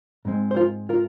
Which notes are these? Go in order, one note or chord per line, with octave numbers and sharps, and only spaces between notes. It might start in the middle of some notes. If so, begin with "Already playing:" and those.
G#2 G#3 C4
C5
F4 A#4
F4 A#4